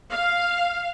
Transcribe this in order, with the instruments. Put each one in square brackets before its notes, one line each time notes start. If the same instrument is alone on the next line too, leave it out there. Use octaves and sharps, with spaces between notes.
[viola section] F5